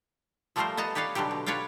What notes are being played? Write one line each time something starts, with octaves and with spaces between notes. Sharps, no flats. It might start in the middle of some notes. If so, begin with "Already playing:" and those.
F3 G3 A3 F4 A#4 C5
B3 D#5 A5 A#5
G4 B4 C#5 D5 F5
B2 D3 F#3 G3 G4
B2
F4 B4 C#5 D5 F5 G5